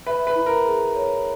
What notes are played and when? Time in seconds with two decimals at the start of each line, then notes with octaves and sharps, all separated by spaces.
0.06 B4 E5
0.27 B4
0.36 E4
0.46 A#4
0.65 G#4
0.96 C#5